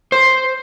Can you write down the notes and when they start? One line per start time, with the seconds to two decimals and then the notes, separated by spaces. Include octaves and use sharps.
0.12 C5